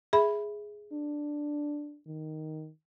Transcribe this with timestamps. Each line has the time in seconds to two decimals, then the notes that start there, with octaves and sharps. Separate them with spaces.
0.13 G#4 E5 B5
0.93 D4
2.07 D#3